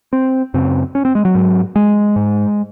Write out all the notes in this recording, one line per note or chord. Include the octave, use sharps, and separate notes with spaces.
C4
F#2 C#3 C4
C#4
C4
G#3
F#3
G#2
G#3
G#2